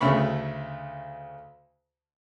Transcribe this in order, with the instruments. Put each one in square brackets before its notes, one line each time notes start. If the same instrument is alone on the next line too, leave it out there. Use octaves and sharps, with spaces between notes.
[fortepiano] D2 C#3 A3 B5 C#6